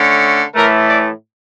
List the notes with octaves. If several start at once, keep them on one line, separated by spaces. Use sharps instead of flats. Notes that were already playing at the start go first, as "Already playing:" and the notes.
Already playing: D3 A3 C#4
A2 E3 A3 A#4
D5